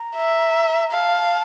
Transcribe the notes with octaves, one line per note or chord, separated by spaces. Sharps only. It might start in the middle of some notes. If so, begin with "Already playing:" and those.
Already playing: A#5
E5
F5 A5